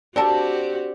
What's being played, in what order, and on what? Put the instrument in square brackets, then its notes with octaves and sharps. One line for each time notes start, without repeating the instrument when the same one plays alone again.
[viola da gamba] C4 F#4 G4 [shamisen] A4 A#4 A5 [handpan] D5